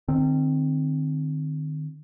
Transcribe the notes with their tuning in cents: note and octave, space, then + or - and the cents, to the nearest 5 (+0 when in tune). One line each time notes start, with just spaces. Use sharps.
D#3 -35 C4 +0